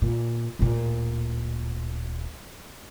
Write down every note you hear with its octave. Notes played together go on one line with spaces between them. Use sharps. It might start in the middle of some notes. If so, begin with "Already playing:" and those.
A#2
D1 A#2